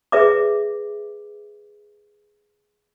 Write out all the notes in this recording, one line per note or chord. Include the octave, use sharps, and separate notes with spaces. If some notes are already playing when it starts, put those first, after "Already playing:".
G#4 B4 E5 D6